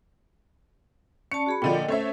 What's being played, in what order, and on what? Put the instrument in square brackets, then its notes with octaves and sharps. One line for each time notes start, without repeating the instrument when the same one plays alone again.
[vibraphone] C#4 D5 A5 [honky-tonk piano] C#7
[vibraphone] F#4 G#4 B5
[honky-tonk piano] A#2 D3 F3 [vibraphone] D#5 G5
[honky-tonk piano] A3 C#5 E5 [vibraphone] C#4 C5